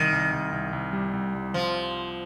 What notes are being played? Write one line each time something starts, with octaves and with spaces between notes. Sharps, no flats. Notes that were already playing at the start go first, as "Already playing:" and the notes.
Already playing: C2 D#3
C2
C2
C2
C2
G3
C2
C2
C2 F3